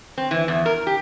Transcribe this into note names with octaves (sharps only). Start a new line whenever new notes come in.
C4
E3
E2
A#4
G4